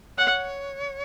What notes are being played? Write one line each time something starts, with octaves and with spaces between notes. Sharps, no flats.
C#5 F#5